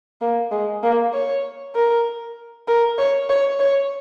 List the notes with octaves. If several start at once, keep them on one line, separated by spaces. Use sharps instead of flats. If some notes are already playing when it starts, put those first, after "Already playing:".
A#3
G#3
A#3
C#5
A#4
A#4
C#5
C#5
C#5